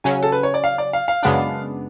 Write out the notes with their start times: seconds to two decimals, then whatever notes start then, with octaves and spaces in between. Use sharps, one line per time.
0.04 C#3 F#3 C#4 G#5
0.23 A4
0.32 B4
0.43 C#5
0.54 D5
0.64 F5
0.78 D5
0.93 F5
1.08 F5
1.23 F#2 C#3 G#3 B3 D4